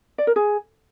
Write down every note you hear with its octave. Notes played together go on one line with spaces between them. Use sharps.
D5
A#4
G#4